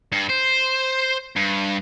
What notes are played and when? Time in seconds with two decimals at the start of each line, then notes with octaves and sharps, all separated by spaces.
0.12 G2
0.30 C5
1.36 G2